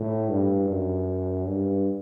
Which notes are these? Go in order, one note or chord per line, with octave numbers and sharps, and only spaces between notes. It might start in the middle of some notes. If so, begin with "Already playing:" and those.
Already playing: A2
G2
F#2
G2